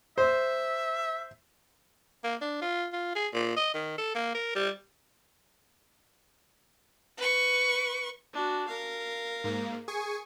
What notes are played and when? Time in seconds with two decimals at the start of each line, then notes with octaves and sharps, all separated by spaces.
0.18 C5 E5
2.24 A#3
2.41 D4
2.61 F4
2.93 F4
3.15 G#4
3.33 A#2
3.57 D#5
3.74 D#3
3.98 A4
4.15 A#3
4.34 A#4
4.55 G3
7.18 B4 C#6
8.34 D4 F#4
8.68 A#4 F5
9.44 G#2 A#3
9.88 G#4 G#5 C#6